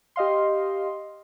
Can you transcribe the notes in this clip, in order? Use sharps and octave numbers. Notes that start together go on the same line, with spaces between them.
G4 D#5 F5 C6